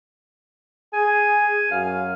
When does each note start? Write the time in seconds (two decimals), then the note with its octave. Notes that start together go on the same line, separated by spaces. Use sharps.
0.94 G#4 G#5
1.71 F#2 F5